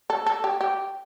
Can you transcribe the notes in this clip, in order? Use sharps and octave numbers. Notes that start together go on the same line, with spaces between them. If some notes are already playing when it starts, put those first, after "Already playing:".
A4
A4
G4
G4